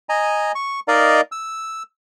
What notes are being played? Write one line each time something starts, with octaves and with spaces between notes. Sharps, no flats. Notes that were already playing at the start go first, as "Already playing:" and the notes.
D#5 G#5 A#5
C#6
D#4 A#4 D5 D#5 F5 A#5
E6